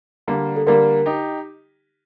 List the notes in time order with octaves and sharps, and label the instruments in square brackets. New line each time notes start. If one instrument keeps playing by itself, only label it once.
[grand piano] D3 G3 A#3
[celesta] A4
[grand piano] D3 G3 A#3 [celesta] A#4
[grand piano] D#4 G4